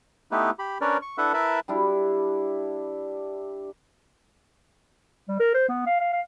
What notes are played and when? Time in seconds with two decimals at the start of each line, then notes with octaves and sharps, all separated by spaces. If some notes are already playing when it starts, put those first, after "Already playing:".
0.32 A3 B3 D#4 E4 G4 B4
0.59 G4 B5
0.81 C#4 D4 A#4 B4 C#5 D5
1.02 C#6
1.18 D4 E4 A4 B4 E5 F#5
1.34 E4 A#4 B4 E5 A5 B5
1.68 G3 D4 E4
5.28 G3
5.40 A#4
5.54 C5
5.69 B3
5.86 F5
6.01 F5
6.12 F5